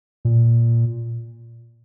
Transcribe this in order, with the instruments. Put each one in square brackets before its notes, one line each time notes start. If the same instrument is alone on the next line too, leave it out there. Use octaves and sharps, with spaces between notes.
[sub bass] A#2